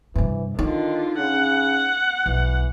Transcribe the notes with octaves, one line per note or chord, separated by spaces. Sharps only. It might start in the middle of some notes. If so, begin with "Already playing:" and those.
G2 C3 E3
D3 D#3 D#4 F4
C#3 F#5
B1 E3